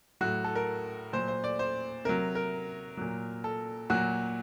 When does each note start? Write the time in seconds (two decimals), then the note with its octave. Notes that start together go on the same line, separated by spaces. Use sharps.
0.21 A2 F#3 F#4
0.44 A4
0.55 A#4
1.13 A#2 F#3 C5
1.28 C5
1.44 D5
1.59 C5
2.05 C3 F#3 A#4
2.35 A#4
2.97 A#2 F#3
3.44 A4
3.90 A#2 F#3 F#4